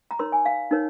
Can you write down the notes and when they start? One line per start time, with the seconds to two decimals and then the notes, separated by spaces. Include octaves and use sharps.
0.11 A#5
0.19 D#4 A#4 C#5 C6
0.32 G#5
0.45 F5
0.71 D#4 A#4 C#5